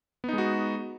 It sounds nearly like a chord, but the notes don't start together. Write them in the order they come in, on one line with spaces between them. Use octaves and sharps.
B3 D#4 G#3 F#4